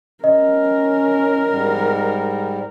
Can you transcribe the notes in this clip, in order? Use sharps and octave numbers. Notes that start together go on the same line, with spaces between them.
C#4 A#4 D#5
G#2 G3